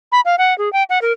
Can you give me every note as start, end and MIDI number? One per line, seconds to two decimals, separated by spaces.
0.12 0.20 83
0.25 0.36 77
0.38 0.56 78
0.58 0.72 68
0.73 0.83 79
0.90 1.01 78
1.02 1.12 70